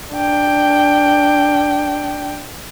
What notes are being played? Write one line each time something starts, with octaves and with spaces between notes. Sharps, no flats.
D4 G5